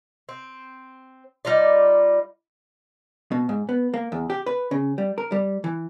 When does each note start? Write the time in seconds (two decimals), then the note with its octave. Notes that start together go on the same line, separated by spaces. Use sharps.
0.29 C4
1.45 G3 D#4 F4 D5
3.32 B2
3.49 G#2
3.69 B3
3.94 A#3
4.12 E2
4.30 G4
4.46 B4
4.71 C#3
4.98 G3
5.18 A#4
5.32 G3
5.64 E3